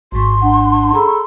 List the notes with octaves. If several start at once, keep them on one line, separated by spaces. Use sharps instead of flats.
G#1 G#2 F#4 C6
D4 F#5
G#4 A4 A#5 B5